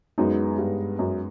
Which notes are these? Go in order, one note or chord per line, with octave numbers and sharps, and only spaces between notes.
F#2 G#3 B3 D#4
G2
F#2